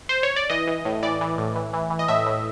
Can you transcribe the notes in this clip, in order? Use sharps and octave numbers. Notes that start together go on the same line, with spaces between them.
C5
C#5
D5
E3 D#5
E3
A2
E3 D5
E3
A2
E3
E3
E3
D#5
A2 E5
A2